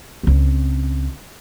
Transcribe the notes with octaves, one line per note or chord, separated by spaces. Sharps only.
C#2 C4